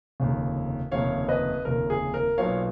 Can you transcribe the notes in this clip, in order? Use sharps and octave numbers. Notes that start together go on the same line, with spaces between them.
F1 D#2 C#3
F1 D#2 C#3 C#5 F5
B4 D#5
F1 D#2 C#3 A#4
G#4
A#4
B1 A#2 F#3 B3 C#5 F5